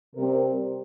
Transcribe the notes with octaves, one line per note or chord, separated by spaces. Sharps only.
C3 G3 C4 A#4